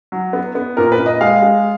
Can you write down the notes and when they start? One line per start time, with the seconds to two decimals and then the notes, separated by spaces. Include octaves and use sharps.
0.12 F#3
0.33 B3
0.55 B3
0.77 A#2 A#4
0.92 B4
0.99 A#2
1.06 D#5
1.21 G#3 F5
1.42 G#3